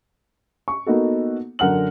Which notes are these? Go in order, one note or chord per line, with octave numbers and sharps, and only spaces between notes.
C#6
A#3 B3 D#4 F#4 A4
F#2 D3 A#4 F#5 F6 F#7